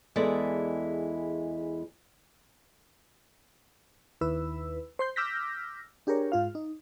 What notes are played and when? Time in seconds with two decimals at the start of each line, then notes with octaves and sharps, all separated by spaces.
0.16 E2 G#3 E4 A4 D5 D#5
4.21 D#2 E4 B4 E6
4.99 C5 C6 G6
5.16 D6 E6 F6 G6 A#6 B6
6.07 D4 G4 G#4 A#4 C#5
6.32 G#2 F4 F5
6.55 D#4